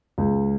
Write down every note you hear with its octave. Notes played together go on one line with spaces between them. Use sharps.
C#2